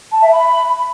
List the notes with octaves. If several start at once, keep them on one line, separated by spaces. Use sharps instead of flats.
A5
E5
B5